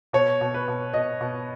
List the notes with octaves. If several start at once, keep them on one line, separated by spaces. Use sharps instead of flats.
B2 C#5
B2
B4
B2
B2 D#5
B2